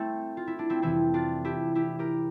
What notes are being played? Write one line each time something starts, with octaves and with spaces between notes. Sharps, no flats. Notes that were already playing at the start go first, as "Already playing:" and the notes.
Already playing: A3 C4 E4
F4
E4
D4
C4 E4
F2 C3 E3 C4 E4
D4 F4
E4 G4
E4 G4
G4 A#4